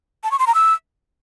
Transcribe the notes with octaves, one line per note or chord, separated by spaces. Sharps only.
A5
C#6
C6
A#5
E6